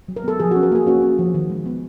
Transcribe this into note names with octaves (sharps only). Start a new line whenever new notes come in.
F#3
A#4
B3 A4
F3 G#4
F#4
C#4
A#4
A#3 G#4
C#4 F#4
C#4
F3
D#3
G#3
B3